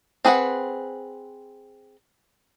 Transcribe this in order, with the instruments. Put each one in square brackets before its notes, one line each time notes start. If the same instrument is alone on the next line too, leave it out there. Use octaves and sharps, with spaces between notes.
[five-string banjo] C4 G#4 B4 E5 F#5